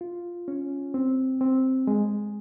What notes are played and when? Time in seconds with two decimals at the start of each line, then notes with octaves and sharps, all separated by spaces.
0.01 F4
0.48 C#4
0.94 C4
1.41 C4
1.87 G#3